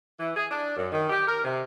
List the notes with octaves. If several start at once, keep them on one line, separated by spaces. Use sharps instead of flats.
E3
G#4
D4
F#2
D#3
G4
A#4
C3